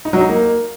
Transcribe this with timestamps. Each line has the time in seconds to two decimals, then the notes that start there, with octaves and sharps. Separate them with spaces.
0.05 D#4
0.13 F#3
0.21 D#4
0.29 A#3